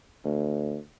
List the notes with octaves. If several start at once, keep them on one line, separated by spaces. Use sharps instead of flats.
D2